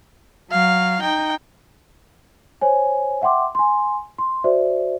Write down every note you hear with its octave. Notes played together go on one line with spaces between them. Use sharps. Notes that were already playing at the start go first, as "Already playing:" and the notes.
F#3 F5
D#4 G5
C5 C#5 G#5
E5 F#5 G5 C6 D6
G#5 C6
C6
F#4 C5 D5 E5